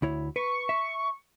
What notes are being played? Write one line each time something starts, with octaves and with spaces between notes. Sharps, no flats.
D2 E4 C#5
B4 C#6
E5